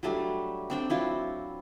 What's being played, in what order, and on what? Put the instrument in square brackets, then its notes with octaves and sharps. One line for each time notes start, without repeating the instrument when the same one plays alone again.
[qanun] F#3 G3 A3 D4
C4 D4 G5
F#3 E4 F4